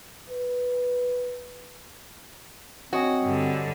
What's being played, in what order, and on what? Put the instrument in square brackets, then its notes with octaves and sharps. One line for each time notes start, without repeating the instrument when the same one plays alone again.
[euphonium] B4
[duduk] C4 [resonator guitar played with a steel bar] F#4 [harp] C#5 D#5 G#5
[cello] G2 D3